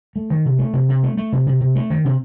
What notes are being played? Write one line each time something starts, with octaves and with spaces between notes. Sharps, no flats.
A3
D#3
C3
A3
C3
C3
A3
A3
C3
C3
C3
A3
D#3
C3